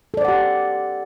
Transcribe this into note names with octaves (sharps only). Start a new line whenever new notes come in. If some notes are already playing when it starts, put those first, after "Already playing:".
G4 A4 C5 D5 F#5